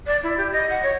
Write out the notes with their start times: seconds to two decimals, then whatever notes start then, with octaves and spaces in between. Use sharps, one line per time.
0.07 D5
0.23 E4
0.38 G4
0.52 D#5
0.70 F#5
0.83 C#5